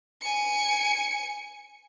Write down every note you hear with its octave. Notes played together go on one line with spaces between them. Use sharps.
G#5 C#7